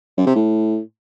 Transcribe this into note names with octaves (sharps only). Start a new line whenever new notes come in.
F#2
C3
A2